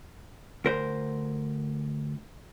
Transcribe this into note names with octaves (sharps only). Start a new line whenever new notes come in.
D2 A#4 C5